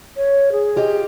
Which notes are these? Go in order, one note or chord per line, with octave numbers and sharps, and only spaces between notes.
C#5
G#4
F4 G4 D#5